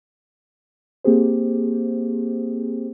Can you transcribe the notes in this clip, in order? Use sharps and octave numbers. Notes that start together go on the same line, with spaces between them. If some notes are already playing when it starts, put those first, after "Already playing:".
A#3 C4 G4 G#4 C5